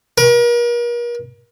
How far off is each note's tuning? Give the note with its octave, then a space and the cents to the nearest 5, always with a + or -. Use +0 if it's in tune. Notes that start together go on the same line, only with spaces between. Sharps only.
A#4 +40